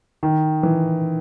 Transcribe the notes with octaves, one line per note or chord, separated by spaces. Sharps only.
D#3
E3